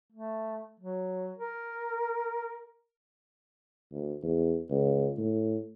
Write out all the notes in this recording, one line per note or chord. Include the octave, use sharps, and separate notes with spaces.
A3
F#3
A#4
D2
E2
C#2
A2